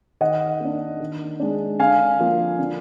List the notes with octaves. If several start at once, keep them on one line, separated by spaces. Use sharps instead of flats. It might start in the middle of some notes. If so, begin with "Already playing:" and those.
D#3 D#5 F#5
A#3 D4
D#3
G#3 D4
D3 F5 G#5
F3 A#3
D3